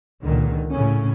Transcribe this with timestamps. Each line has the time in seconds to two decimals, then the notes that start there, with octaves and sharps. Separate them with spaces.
0.24 C#2 A#2 D3 D#3
0.70 A2 C#3 C#4